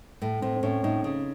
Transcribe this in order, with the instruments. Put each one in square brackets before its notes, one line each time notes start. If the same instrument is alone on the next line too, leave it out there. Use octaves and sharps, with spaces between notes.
[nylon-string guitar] A2
[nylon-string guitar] A2 [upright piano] C4
[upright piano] C4
[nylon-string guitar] A2 [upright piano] C#4
[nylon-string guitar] A2 [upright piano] D#4
[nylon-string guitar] C#3